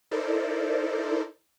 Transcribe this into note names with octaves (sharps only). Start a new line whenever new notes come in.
D#4 E4 A4 A#4 C5 D5